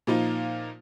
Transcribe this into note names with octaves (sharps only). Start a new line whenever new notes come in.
A#2 F3 A#3 D#4 F4